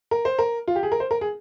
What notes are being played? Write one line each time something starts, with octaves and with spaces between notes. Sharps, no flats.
A#4
C5
A#4
F4
G4
G#4
A#4
C5
A#4
G#4